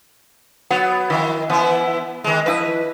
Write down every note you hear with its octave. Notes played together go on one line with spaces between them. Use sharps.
F#3 B3 F#5
D#3 F3 E4
E3 B3 E4
D#3 G#3
F3 E4 B4 D#5